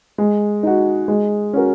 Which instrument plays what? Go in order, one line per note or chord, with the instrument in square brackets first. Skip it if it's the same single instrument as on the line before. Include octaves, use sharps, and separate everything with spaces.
[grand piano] G#3
D#4 F#4
G#3
C#4 F#4 A#4